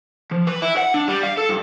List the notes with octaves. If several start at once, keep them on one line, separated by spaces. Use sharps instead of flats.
F3
B4
E4
F#5
D4
G3
F5
A4
G2